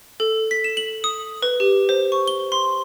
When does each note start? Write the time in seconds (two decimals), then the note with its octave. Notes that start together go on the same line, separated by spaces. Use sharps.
0.20 A4
0.51 B6
0.64 E7
0.77 F#7
1.04 D#6
1.42 B4
1.60 G4
1.89 C5
2.12 C#6
2.28 G7
2.52 C6